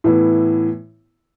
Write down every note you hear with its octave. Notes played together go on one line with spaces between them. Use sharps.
A2 E3 B3 E4